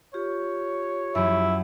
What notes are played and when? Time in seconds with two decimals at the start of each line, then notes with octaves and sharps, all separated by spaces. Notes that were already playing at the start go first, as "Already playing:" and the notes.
0.14 F4 G4 C#5
1.15 F#2 F#3 E4